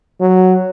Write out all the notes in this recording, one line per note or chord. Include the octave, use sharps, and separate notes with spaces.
F#3